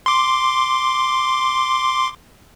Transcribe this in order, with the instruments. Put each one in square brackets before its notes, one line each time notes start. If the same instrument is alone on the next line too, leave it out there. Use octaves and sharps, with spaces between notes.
[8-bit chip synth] C6 D6